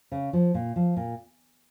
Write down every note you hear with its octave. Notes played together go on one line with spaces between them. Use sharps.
C#3
F3
A#2
F3
A#2